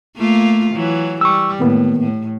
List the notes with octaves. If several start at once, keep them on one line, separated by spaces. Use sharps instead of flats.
A3 A#3 F4
E3 F#3
G3 C#6 E6
A2 D#3 A#3 B3
A2